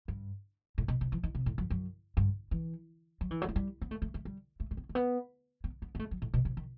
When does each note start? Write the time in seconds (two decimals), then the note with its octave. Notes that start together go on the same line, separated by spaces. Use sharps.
0.08 G2
0.78 A2
0.88 B2
1.01 C3
1.12 E3
1.23 D#3
1.35 C3
1.46 A2
1.58 F#2
1.70 F#2
2.17 G2
2.51 E3
3.21 F#3
3.31 E3
3.42 F#3
3.48 A3
3.56 G3
3.82 B3
3.91 A3
4.02 A3
4.14 A3
4.25 G3
4.60 A3
4.71 A3
4.77 B3
4.89 A3
4.95 B3
5.64 B3
5.82 B3
5.95 B3
5.99 A3
6.11 F#3
6.22 A2
6.34 B2
6.45 C3
6.57 D#3